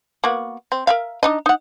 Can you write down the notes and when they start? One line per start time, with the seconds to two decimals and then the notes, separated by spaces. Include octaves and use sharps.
0.24 A#3 B3 F#4
0.72 C4
0.87 A#4 E5 F5
1.23 D4 D#4 D#5
1.46 D#4 F#5